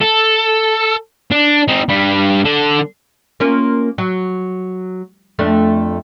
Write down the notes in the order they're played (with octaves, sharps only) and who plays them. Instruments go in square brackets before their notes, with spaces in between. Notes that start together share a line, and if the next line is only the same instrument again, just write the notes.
[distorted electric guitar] A4
D4
C4 D#4
G2 G3
D3 A4
[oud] A#3 C#4 F4
F#3
F2 A3 D4